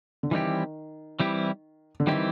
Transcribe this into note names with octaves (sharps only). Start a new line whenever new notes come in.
D3
D#3 E3 G3 C4 E4 G4
E3 G3 C4 E4 G4
D3
D#3 E3 G3 C4 E4 G4